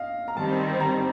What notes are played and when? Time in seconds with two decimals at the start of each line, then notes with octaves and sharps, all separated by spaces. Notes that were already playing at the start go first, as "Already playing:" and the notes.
Already playing: D#5 F5
0.28 A#5
0.37 D#3 G3 C4 A5
0.80 A#5